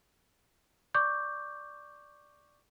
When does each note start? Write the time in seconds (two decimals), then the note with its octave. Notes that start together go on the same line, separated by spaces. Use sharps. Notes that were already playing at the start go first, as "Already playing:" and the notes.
0.94 D5 C#6 D6 G6